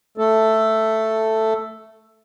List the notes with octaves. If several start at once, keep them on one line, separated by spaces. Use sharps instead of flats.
A3 A4